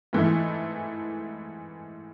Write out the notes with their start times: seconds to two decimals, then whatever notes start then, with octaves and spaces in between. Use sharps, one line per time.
0.13 G#2 E3 A3